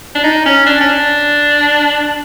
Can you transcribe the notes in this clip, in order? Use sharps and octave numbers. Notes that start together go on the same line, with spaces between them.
D4
D#4
C#4
D4
C#4
D4